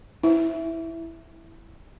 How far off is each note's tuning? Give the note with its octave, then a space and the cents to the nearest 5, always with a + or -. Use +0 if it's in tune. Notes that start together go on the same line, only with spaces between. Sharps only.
E4 +0 E5 +0